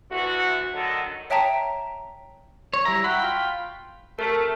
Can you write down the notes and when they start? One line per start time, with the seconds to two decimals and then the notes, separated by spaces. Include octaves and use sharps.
0.11 D2 E3 A3 F#4
0.73 D3 D#3 F#3 A4 D#5
1.30 C#5 E5 G5 A5 A#5 B6
2.73 C#5
2.85 G3 E4 A#5
3.04 F#4 G5 B5
3.22 F4
4.19 C3 A3 A#4